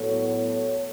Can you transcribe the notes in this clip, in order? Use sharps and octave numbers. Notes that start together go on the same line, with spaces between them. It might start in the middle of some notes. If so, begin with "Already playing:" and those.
Already playing: A2 F#3 B3 A4 C#5
A4 C#5